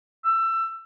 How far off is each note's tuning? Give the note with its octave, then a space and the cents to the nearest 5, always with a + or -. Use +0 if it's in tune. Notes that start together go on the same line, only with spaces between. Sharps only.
E6 +20